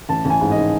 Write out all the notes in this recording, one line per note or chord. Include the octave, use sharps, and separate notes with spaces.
A1 A5
A1 G#5
G#2
D#3 D#5